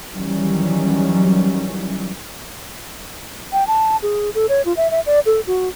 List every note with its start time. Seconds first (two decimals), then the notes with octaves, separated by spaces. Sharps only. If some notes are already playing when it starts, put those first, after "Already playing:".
0.13 D#3 E3 F#3 G3 C#4
3.53 G5
3.67 A5
4.02 G#4
4.35 A4
4.49 C#5
4.65 F4
4.77 E5
4.91 E5
5.06 D5
5.26 A4
5.47 F#4